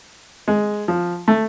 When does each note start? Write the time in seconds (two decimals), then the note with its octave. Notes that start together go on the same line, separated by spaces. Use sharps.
0.48 G#3
0.88 F3
1.28 A3